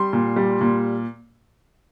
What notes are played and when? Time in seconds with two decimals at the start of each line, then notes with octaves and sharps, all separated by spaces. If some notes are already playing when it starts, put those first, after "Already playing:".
Already playing: G3 C6
0.13 A#2
0.36 G3
0.61 A#2